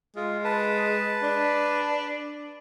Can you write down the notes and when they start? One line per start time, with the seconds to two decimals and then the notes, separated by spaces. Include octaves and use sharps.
0.16 G#3 F4
0.44 B4 A5
1.22 D4